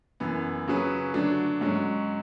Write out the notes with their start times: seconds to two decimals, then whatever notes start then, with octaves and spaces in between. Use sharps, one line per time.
0.20 F#2 E3 B3
0.67 C#3 F#3 C#4 G#4 B4
1.14 D3 F#3 A3 D4
1.61 G#2 F#3 C#4